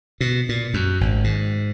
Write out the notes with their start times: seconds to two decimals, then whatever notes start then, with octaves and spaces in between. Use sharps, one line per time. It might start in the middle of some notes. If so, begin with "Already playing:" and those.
0.21 B2
0.49 A#2
0.74 F#2
1.01 G#1
1.24 G#2